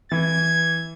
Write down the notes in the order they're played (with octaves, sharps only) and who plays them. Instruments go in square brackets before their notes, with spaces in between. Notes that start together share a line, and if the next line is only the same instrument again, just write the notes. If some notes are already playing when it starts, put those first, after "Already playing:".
[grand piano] E3 [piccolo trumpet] G#6